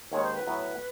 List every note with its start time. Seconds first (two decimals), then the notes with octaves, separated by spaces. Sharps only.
0.11 D#2 D#3 G#3 C4 D#4 C#5
0.23 C5
0.35 B4
0.47 A2 F#3 B3